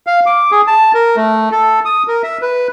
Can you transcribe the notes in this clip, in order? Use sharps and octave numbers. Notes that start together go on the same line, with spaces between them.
F5
D6
G#4
A5
A#4
A3
A4
D#6
A#4
E5
B4